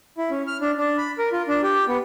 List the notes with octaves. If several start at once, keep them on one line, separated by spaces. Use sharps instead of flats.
E4
C#4
F6
D4
D4
B5
A#4
F4
D4
G4
B3